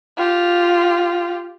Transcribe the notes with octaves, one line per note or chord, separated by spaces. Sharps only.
F4 G4